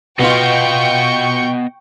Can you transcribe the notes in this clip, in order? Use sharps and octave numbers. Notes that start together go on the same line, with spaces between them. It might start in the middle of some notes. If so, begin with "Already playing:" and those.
B2 B3 F4 D#5 F#5 G5 C#6 G6